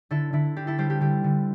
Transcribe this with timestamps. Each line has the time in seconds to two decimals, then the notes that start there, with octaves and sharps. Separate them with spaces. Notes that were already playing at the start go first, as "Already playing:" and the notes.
0.11 D3 E4 A4
0.33 D3 E4
0.56 D4 G4
0.67 E4 A4
0.78 G3 G4 C5
0.90 G4
1.01 D3 G4
1.24 D3